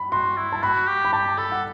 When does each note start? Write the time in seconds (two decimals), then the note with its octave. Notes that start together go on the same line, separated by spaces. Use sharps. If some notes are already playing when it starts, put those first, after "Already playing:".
Already playing: B5
0.12 F#4 C6
0.37 E4
0.52 A5
0.63 F#4 B5
0.87 G4
1.05 B5
1.13 G4 A5
1.38 A4 B5
1.52 F#5